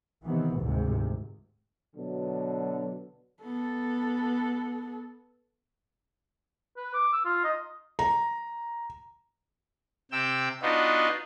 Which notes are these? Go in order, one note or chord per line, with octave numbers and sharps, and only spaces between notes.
C3 D#3 E3 B3
G#1 D2 G#2 C3 G#3
B2 D3 F#3
B3 A4
B4
D6
E6
F4
D#5
A#5
C3 G5 E6
B3 D4 D#4 F4 F#4